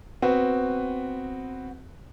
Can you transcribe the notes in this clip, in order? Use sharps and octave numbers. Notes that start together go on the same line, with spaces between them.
B3 C4 F#4 B4